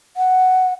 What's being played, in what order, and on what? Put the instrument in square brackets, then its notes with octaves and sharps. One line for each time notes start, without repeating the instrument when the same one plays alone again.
[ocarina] F#5